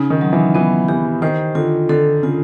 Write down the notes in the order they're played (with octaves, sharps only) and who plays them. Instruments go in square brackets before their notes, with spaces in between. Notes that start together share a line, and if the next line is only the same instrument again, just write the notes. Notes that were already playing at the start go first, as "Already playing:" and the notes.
Already playing: [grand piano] C#3 [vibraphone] D#4
[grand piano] D#3
[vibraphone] F#3
[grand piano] E3
[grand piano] E3 [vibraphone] B3
[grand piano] E3 [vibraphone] G4
[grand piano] D#3 [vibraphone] C5
[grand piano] D3 [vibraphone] F4
[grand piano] D3 [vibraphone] A4
[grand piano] C#3 [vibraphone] F4